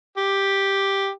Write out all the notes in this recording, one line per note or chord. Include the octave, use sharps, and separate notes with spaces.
G4